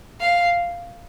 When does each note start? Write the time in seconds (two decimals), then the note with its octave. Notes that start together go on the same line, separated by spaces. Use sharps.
0.21 F5